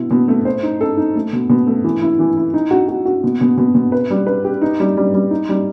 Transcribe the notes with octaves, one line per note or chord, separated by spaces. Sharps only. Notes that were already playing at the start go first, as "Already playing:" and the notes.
Already playing: B2 E4
B2
A3
C5
D#4
A4
D#4
A3
B2
B2
A3
E3
E4
E3
E4
D#4
F#4
F#4
F#4
B2
B2
B2
B2
B4
G3
B4
G4
D#4
G3
G3
G3
D#4
G3